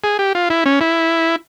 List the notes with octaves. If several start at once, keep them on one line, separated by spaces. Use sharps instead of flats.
G#4
G4
F4
E4
C#4
E4